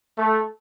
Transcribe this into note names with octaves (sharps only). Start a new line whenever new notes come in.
A3